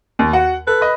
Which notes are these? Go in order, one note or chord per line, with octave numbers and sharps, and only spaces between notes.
D#2
F#4 F#5
A4 B4
D#5 B5